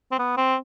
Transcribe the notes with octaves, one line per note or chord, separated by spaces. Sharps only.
C4
B3
C4